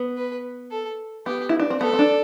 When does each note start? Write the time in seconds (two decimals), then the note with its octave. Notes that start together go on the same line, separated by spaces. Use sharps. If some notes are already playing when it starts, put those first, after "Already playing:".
Already playing: B3
0.17 B4
0.71 A4
1.26 B3 G4
1.49 E4
1.60 D4
1.70 C4
1.80 B3 A4
1.93 C4
1.99 D4